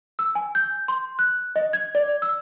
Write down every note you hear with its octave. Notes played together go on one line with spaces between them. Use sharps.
E6
G#5
G6
C6
F#6
D#5
G#6
D5
E6